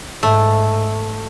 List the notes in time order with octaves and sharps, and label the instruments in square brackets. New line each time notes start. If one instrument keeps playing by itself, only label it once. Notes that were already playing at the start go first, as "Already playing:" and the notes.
[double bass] G#2 [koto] A3